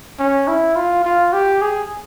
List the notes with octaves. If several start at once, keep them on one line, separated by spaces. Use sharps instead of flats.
C#4
E4
F4
F4
G4
G#4